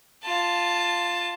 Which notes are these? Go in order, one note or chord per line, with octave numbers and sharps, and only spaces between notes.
F4 A5